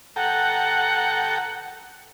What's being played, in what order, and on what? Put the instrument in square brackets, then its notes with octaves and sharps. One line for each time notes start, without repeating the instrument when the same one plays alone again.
[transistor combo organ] A4 G5 A#5 [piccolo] F#5